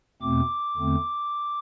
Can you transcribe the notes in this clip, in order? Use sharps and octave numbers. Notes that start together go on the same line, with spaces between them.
E2 B2 A3 C4 D6
E2 D3 A3 C4